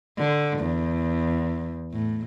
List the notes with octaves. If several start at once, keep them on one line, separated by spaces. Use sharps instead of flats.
D3
E2
A2